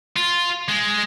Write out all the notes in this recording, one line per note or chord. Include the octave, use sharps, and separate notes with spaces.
F4
G#3